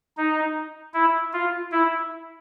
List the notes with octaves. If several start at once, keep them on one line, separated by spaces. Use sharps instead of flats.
D#4
E4
F4
E4